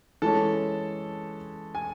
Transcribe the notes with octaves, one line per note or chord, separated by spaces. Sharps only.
E3 G#3 C#4 A4 A5
G#5